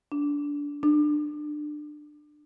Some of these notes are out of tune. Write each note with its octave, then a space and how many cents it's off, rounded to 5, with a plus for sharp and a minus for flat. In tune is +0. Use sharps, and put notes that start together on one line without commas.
D4 -20
D4 +25